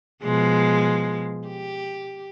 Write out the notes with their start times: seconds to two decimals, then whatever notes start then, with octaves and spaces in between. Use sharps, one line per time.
0.23 B2 F3 G#3
1.48 G4